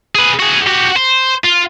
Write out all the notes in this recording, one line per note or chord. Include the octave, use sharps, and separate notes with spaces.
G#4 B4
F#4 G#4
F#4 G4
C5
F4